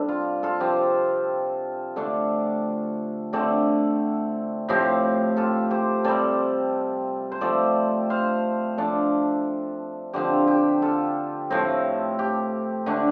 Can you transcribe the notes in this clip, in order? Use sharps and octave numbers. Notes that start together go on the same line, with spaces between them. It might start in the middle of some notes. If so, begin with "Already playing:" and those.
Already playing: C3 G3 D4 A4
F4
F4 A4
C3 F3 C4 G4 C5
D3 A3 D4 A4 D5
D3 A3 C4 A4 D5
A2 F3 C4 G4
F4 A4
G4 C5
C3 G3 C4 A4 D5
C5
F3 A3 C4 A4 D5
C5 F5
F3 D4 A4 D5
D3 F3 C4 G4 C5
G4
F4 A4
A2 F3 A3 C4
G4
D3 A3 D4